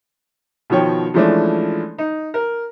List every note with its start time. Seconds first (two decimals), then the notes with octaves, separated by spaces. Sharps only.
0.70 B2 D#3 F3 C#5 G5
1.14 E3 F3 G#3 A3 C#4 D4
1.98 D#4
2.34 A#4